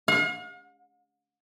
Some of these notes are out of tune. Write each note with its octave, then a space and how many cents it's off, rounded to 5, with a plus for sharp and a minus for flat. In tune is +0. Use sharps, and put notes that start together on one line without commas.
F5 +45